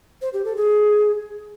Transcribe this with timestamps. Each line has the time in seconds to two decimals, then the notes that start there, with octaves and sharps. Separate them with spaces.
0.21 C5
0.33 G4
0.44 A4
0.56 G#4